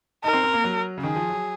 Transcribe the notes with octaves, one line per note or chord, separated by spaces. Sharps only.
D#4 A#4
C4
C4
A#3
F#3
C#3
D#3 G#4
F3
F#3